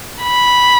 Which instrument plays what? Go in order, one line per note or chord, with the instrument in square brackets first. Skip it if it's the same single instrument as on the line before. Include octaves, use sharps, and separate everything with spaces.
[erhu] B5